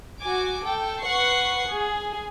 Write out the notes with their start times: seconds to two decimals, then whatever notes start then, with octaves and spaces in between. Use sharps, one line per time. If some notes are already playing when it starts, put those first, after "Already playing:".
0.21 F#4 G#5 D6
0.64 A4 G5
1.02 B4 F#5 C#6 C7
1.69 G#4